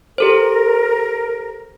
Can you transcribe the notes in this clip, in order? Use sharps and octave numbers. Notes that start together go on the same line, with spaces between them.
G4 A4 A#4 C5